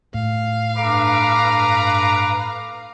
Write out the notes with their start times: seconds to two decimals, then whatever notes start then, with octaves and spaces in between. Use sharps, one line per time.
0.14 A2 F5
0.76 G2 A4 B4 A#5 D6